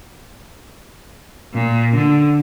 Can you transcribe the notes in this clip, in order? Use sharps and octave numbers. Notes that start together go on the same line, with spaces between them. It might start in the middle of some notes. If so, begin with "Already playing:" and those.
A#2
D3